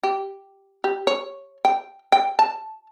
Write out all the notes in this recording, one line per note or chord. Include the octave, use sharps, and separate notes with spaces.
G4
G4
C#5
G5
G5
A5